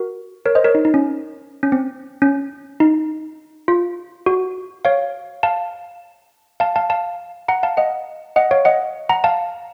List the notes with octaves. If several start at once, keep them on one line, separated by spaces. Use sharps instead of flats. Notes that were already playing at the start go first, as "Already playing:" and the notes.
Already playing: F#4 A#4
A#4 C#5
C5 D#5
A#4 C#5
D#4
D#4
C#4
C#4
C4
C#4
D#4
F4
F#4
C#5 F5
F5 A5
F5 A5
F5 A5
F5 A5
F#5 A#5
F5 A5
D#5 F#5
D#5 F#5
C#5 F5
D#5 F#5
F#5 A#5
F5 A5